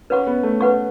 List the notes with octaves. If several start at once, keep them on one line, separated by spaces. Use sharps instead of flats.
C#4 B4 F#5 C#6
B3
A3
B4 F#5 C#6